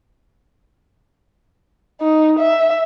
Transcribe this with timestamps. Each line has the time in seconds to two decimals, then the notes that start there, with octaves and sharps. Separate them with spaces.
2.01 D#4
2.39 E5